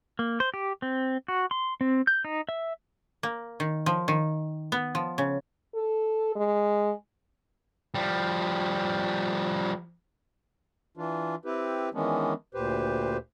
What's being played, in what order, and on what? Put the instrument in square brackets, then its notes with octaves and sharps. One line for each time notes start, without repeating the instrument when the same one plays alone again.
[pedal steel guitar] A#3
C5
G4
C4
F#4
C6
C4
G6
D#4
E5
[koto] A#3
D#3
F3
D#3
B3
F3
C#3
[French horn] A4
G#3
[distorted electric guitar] F3 G3
[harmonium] E3 D4 F4
C4 E4 G4 B4
D#3 E3 G#3 B3 C#4 D4
D2 A#2 G4 B4 C5